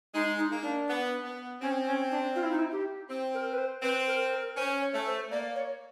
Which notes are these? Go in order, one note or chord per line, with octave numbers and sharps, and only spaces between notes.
G#3 D#4
D#4
A#3
D4
B3
B3
C4 C#4
C#4
D4
F4
E4
D#4
E4
G4
C4
A#4
B4
C5
C4 B4
A#4
A#4
C#4 C5
C#5
A3
C5
A#3 D5
C#5